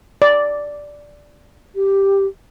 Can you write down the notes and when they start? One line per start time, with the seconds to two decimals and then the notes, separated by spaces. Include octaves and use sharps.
0.22 D5
1.74 G4